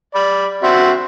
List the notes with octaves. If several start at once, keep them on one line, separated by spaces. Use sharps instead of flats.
D5 B5
C4 F#4 E5